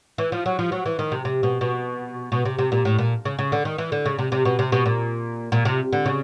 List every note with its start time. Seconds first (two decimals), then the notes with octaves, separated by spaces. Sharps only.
0.18 E3
0.32 F3
0.46 F#3
0.59 F3
0.72 F#3
0.86 E3
0.99 D#3
1.12 C3
1.25 C3
1.43 B2
1.61 B2
2.32 B2
2.45 C3
2.58 C3
2.72 A#2
2.85 A2
2.98 A#2
3.25 C#3
3.39 C#3
3.52 D3
3.65 D#3
3.78 E3
3.92 D3
4.06 C#3
4.18 C3
4.32 C3
4.45 B2
4.59 C3
4.72 B2
4.86 A#2
5.52 A#2
5.65 C3
5.93 D3
6.06 C#3